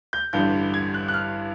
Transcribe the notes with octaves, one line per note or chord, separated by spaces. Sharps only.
G6
A1 G2 D3 G3 G6
G#6
F#6
F#6
F6